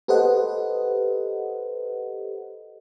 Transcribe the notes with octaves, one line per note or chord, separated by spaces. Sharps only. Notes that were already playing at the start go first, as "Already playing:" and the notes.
G4 A4 B4 C5 D#5 F#5